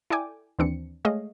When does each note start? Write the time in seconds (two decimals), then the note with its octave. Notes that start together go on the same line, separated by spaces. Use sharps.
0.10 E4 A4 D5 G5 G#5 D6
0.59 D#2 E3 C4 D4 C#7
1.05 G#3 A3 G#4 C#5 D#5 F5